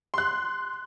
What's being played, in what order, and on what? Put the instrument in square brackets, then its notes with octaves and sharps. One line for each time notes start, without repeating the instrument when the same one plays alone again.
[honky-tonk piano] C6 F#6